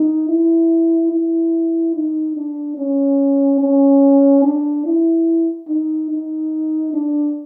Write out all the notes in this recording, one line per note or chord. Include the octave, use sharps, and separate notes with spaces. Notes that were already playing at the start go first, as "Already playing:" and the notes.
Already playing: D#4
E4
E4
D#4
D4
C#4
C#4
D4
E4
D#4
D#4
D4